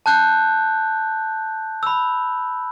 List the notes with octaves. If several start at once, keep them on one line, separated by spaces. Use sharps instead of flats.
A5 F#6 G6
B5 E6